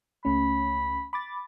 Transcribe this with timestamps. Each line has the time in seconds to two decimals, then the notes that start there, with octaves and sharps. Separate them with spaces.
0.25 C#2 A3 C#4 B5
1.13 B5 D6 A6